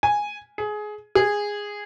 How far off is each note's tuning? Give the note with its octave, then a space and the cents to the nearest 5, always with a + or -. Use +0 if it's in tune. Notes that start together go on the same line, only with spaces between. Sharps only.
G#5 -5
G#4 +20
G#4 -10